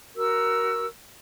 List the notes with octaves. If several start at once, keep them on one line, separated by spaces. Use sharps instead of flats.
F#4 A#4 E6